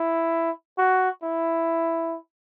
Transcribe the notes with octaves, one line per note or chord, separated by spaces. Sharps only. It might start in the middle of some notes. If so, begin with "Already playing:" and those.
Already playing: E4
F#4
E4